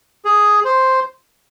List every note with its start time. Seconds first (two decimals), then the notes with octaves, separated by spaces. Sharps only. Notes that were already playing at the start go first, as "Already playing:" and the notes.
0.25 G#4
0.65 C5